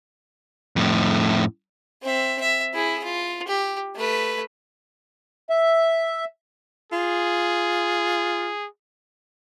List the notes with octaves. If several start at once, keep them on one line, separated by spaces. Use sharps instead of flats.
F2 A2
C4 E5
E5
E4 G#4
F4
G4
A3 B4
E5
F4 G#4